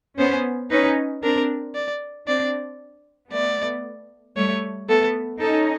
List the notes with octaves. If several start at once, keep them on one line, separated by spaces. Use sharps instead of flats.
B3 C#4 C5
C#4 D#4 B4
C4 D4 A#4
D5
C4 D4 D5
A3 B3 D5
G3 A3 C#5
A3 B3 A4
C#4 D#4 A4